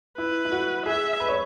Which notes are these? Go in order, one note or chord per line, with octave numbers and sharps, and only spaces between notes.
E4 B4
E4
F#4
G#4 E5
B4
C#5